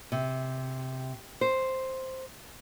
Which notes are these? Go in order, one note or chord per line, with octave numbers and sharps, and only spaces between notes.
C3
C5